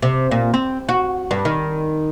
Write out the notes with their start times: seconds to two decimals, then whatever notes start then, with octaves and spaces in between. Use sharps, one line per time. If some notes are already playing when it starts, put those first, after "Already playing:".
0.02 C3
0.31 A#2
0.54 C4
0.89 F#4
1.31 G2
1.45 D#3